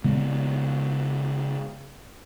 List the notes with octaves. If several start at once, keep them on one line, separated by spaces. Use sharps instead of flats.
C#3 G#3 B3